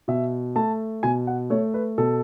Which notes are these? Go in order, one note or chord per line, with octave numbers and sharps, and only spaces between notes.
B2 E5
A3 A5
B2 G#5
F#5
A3 C#5
B4
B2 A4